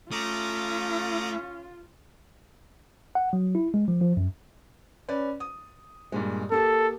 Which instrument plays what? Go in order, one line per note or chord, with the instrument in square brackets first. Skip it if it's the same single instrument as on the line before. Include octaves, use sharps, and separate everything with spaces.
[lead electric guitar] A3 [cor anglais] C#4 [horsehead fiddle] F4 [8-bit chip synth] A#5 D6 D#6
[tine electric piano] F#5
F#3
E4
G#3
F3
F3
F#2
[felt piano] C#4 B4 D5
D#6
G2 A#2 G#3
[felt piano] A#3 G4 A5 [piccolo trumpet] A4